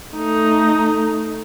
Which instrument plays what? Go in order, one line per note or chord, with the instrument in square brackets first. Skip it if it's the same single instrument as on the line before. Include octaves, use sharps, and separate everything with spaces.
[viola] A3 D#4